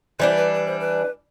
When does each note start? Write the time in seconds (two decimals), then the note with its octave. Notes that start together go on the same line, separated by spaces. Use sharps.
0.20 E3 G3 D4 C5
0.37 B4
0.54 B4
0.66 C5
0.80 B4